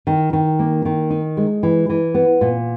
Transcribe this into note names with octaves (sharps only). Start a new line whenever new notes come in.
D#3
D#3
A#3
D#3
D#4
G#3
E3
E3
B3
A#2